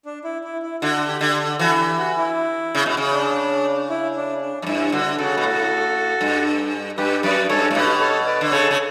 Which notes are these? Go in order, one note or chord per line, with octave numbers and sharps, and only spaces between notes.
D4
E4
E4
E4
D3 F#4
G4
D3
E3 F#4 A4
G4
F#4
E4
C#3
B2
C#3
D4
E4
D4
D4
F#2
G2 E4
D3 F#4
C#3 F#4 A4
B2
A2
G2
G2 G4 B4
F#2 B4 D5
G2 A4 C#5
A2
B2 G4 B4
A4 C#5
B4 D5
D3
C#3 A4 C#5
C#3